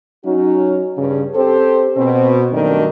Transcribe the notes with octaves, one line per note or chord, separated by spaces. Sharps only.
F#3 C#4 D#4 F#4
G2 C#3 G3
C4 G4 A4 C5
B2 C4
G2 B2 D#3 F#3 A3 D4